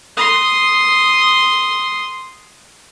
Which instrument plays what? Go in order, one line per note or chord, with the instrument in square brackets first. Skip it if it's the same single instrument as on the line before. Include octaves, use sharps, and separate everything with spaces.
[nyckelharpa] C6 D#6